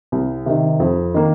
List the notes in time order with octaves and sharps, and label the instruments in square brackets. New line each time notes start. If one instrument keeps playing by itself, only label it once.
[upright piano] C2
C3 D#3
F2
D#3 A#3